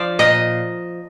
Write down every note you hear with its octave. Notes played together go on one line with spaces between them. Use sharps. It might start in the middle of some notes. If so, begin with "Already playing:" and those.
Already playing: F3 D5
A#2 D#5